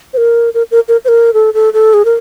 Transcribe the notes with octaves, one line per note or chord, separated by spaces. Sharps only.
C5
A#4
A#4
A#4
A#4
C5
A#4
A4
A4
A4
G#4
A#4